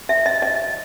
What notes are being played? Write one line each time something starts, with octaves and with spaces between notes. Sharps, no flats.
E5
D#5
D#5